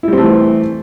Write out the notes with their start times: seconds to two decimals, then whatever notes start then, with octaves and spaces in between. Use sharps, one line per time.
0.03 E4
0.08 G3
0.13 C4
0.18 A3
0.22 E3